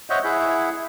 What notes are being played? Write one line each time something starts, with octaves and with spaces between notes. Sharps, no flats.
C5 C#5 D#5 E5 F#5
E4 G#4 E5 F#5